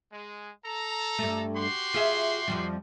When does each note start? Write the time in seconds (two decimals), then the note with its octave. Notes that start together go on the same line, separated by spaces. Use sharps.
0.12 G#3
0.64 A4 A#5
1.18 G2 A3
1.56 F#4 G4 C6
1.94 F4 G#4 E5
2.48 F2 F3 G3